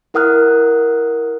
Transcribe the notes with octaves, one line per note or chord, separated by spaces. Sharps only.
E4 A#4 F#5 D#6 F6 F#6